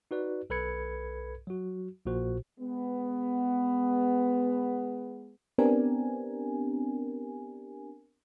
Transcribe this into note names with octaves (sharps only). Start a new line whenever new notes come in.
D#4 F#4 B4 D5
B1 A4 B4 B5 G#6 C#7
F#3 F#4
A#1 A#2 F#4 C5
G#3 B3
B3 C4 D4 G4 A#4 G#5